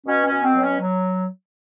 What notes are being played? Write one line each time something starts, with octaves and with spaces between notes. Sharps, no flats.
B2 C#4
C#4
B2
C4
F#3
C#4
F#3